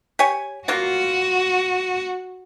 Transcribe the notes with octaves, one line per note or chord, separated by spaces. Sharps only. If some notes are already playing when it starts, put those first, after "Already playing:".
G4 C#5 G#5
F#3 A#3 F4 F#4